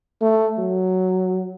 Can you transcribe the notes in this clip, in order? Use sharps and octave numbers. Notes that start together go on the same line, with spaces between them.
A3
F#3